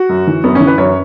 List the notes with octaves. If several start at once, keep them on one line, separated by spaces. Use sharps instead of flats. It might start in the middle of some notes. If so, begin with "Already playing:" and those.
Already playing: F#4
F#2
E3
F#2 B3
C#4
E3
B4
F#2 C#5